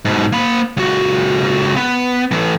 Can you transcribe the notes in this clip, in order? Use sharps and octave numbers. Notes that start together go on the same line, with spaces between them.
G#2 B2
A#3 B5
C#2 F#4
B3
A2 E3